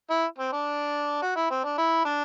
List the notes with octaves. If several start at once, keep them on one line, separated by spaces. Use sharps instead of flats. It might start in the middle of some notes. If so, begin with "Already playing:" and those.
E4
C4
D4
F#4
E4
C4
D4
E4
D4